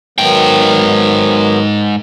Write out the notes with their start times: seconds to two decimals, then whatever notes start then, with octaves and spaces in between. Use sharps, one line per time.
0.18 G#2 D#3 F#3 B3 G5